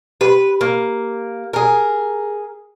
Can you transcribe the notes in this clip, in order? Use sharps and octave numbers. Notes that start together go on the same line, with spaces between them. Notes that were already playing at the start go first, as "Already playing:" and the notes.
G4 B4
A#3
G#4 A#4